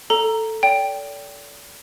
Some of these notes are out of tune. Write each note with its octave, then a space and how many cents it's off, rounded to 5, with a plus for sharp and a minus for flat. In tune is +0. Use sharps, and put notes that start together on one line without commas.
A4 +5 A#5 -5
D5 -40 G5 +0